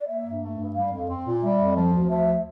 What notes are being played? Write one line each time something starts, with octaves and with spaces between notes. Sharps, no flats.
D5
A#3 E5
G2
A3
G2
G3 F5
F2
C4
A#2
G3 E5
F2
F3
D2
F3 E5